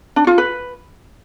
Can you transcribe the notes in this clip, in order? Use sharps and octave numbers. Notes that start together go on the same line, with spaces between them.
D4
F4
B4